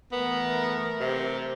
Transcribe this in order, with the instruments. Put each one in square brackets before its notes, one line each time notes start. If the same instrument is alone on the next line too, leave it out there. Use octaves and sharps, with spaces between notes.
[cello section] E3 A3 A#4 [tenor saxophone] B3
[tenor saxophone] C3